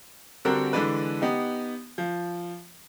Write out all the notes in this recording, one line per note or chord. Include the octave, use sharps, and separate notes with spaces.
D3 G3 C4 D4 F#4 A#4
D3 E3 G#3 D4 B4
B3 D#4 G4
F3